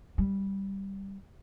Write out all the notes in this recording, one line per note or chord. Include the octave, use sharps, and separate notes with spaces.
G3